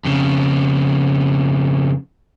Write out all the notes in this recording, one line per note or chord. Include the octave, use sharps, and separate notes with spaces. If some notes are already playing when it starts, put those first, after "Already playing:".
F2 C#3